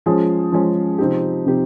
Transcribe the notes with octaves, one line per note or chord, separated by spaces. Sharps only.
F3 G#3 C#4 G#4
F3 G#3 C#4 G#4
C3 F3 C4 D#4 G4
C3 F3 C4 D#4 G4